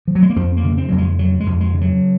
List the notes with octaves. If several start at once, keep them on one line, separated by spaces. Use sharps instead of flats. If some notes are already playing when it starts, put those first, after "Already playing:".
F3
F#3
G#3
A#3
F2 C4
A#3
C#3
C4
F2 F#3
G#3
C#3 F#3
G#3
F2
G#3
C#3
F#3